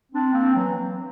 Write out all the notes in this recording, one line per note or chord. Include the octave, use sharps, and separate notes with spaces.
C4 D4
A#3 C4
E3 F#3